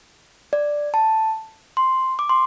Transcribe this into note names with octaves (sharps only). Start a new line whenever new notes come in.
D5
A5
C6
D6
C6